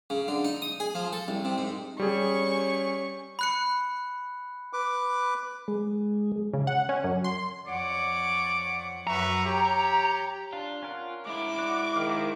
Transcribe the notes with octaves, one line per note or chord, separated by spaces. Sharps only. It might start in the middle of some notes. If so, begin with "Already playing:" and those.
C#3
D3
D#4
D#6
G#4
F3
A4
C2
C3
G#2
G3 C#4 G#4 C#6
B5 F#6 C#7
B4 D6
G#3
C#3
F#5
C#4
F#2
C6
F2 C#5 D5 F#5 D6
F#2 B4 E5 A#5 C#6
G4 C#5
D4 F4
C#4 A#4 F#5
G#3 E4 D6
F#4 D5 F#5
G#2 D#3 F5